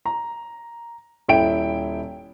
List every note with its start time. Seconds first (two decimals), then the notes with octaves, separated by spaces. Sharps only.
0.06 A#5
1.28 D#1 E4 G5 D7